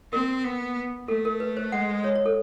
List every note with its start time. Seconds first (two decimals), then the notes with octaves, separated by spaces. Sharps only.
0.13 C4 A#4
0.45 B3
1.08 A3 A4
1.25 A#4
1.40 B4
1.57 C5
1.72 G#3 F#5
2.04 C#5
2.15 C#5
2.26 A4